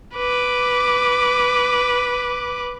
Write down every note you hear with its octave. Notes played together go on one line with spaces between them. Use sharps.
B4 D6